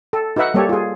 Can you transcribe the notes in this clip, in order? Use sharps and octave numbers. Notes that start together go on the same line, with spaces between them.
A4
D#4 F#4 B4 E5 F#5
G3 A#3 G4 A4 C#5
F4 G#4